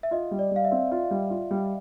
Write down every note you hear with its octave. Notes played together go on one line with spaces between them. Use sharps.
E5
F4 D#5
G3
D5
G3 F5
E5
C4
F4
G3
F4
G3